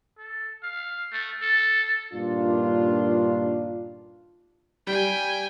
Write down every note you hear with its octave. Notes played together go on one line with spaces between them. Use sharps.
A4
F5
A3
A4
G2 A#2 D#3 D4 F4
G3 G5 G#5